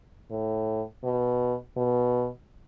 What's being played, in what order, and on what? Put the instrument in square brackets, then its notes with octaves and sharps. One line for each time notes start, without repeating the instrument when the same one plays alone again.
[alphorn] A2
B2
B2